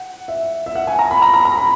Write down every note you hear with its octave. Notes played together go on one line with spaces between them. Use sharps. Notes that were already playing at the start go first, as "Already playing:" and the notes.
Already playing: F#5
E5
E5
F#5
G#5
A#5
B5
A#5
A#5
A#5
B5